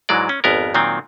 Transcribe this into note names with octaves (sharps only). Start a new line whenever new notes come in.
G#2 E3 F#3 G#3 D5
C#4
G#1 F2 B3 A#4
A#2 D#3 F#3 C4